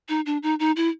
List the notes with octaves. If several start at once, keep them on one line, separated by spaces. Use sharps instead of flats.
D#4
D4
D#4
D#4
E4